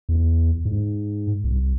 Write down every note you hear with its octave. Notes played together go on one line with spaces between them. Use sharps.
E2
G#2
C2